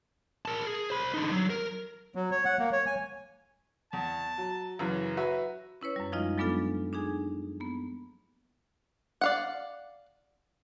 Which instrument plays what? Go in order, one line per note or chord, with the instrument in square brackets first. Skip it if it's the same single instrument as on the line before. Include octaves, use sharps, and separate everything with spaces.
[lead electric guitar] A#4 A5
G#4
C5 B5
D3 D#4
F#3
A#4
[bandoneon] F#3
C#5
F#5
A#3
C#5
G#5
[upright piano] E2 [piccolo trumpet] A5
[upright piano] F#3
[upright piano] F#2 C#3 E3 [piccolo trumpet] A#5
[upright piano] F#4 B4 E5
[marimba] C#4 E4 B4 C#5
F#2 G3
F3 G#3 D#4 F4 D#5
F#3 G#3 B3 D4 F4 A4
D4 D#4 G#4 G#5
A#3 B3
[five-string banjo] D5 F5 F#5